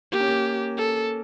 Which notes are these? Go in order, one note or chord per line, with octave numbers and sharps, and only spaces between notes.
A#3 G4
C#4
A#3
A4